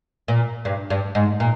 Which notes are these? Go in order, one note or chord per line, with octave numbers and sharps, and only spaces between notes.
A#2
G2
G2
G#2
A#2